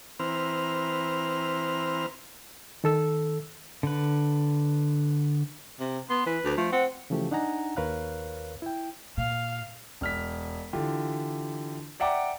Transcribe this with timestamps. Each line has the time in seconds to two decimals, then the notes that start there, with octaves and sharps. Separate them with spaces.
0.19 E3 C4 B4 C5 A#5 F6
2.84 D#3 A4 E6
3.83 D3 B4
5.80 C3
6.10 B3 C6
6.26 E3 B4
6.44 D2
6.57 F3 A3
6.72 C4 F#5
7.10 C#3 E3 F3 A3 G4
7.31 D4 D#4 F#5 G#5 A#5
7.77 D#2 A#4 B4 C#5 F5 F#6
8.62 E4 G5
9.17 A#2 F5
10.01 E1 F6 B6
10.73 D3 E3 F4 G4
12.00 D5 E5 F#5 G5 A#5 D6